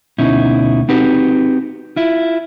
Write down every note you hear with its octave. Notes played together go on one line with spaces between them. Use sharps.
D2 B2 C#4 D#4 E4
C4 D#4 F#4 G4 B4
E4 F4